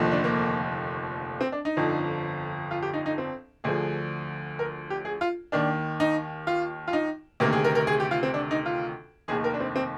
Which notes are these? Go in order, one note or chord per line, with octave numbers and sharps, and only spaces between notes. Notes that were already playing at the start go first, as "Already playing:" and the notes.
Already playing: F1 D#2 D3 F3
D4
A#3
C4
D4
D#4
G1 F2 D3 F3
F4
G4
D#4
D#4
C4
D2 D3 F3 G#4
A#4
G4
G#4
F4
D#2 D#3 D4
D#4
F4
F4
D#4
D2 C3 D#3 A#3
G#4
A#4
A#4
G#4
G4
F4
C4
D4
D#4
F4
F1 D#2 D#3 G#4
A#4
D4
C4
C4